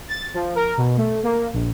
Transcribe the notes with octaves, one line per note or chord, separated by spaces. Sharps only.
A6
F3
A#4
B2
A3
A#3
A#1